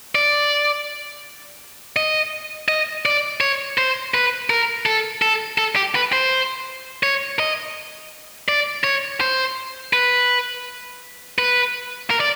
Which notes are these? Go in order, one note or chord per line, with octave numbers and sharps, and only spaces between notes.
D5
D#5
D#5
D5
C#5
C5
B4
A#4
A4
A4
A4
G4
B4
C5
C#5
D#5
D5
C#5
C5
B4
B4
A#4
D5